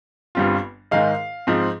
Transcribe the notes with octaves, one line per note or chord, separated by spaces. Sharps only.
G1 G2 G3 C4 F4
G#2 D#3 G#3 D#4 F5
G#2 F3 C4